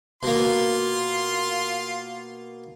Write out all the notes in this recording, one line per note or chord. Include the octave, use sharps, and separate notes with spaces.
B2 A#3 F4 C6